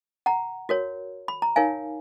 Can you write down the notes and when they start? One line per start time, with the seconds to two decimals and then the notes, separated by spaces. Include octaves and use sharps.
0.26 F#5 A#5
0.69 F#4 A#4 C#5
1.28 B5
1.42 A#5
1.56 D#4 A#4 C#5 F5 G#5